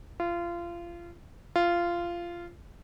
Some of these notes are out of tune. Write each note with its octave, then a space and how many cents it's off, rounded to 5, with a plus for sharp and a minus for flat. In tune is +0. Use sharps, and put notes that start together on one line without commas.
F4 -25
F4 -15